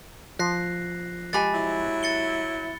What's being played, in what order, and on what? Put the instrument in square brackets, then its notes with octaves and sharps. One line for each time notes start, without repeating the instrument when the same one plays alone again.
[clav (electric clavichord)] F3 [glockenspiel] F#6 A#6 C7
[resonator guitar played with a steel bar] G#3 G4 G#5 [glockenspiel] B5 A6
[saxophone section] F#3 E4
[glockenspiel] A6 C#7 G7